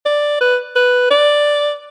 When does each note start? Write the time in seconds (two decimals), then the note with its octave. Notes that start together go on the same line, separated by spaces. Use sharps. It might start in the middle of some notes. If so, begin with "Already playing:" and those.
0.05 D5
0.41 B4
0.76 B4
1.11 D5